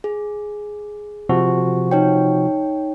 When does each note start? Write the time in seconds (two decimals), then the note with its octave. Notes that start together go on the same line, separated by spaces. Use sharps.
0.04 G#4
1.29 C3 F3 F#4
1.91 D#4 C#5 G5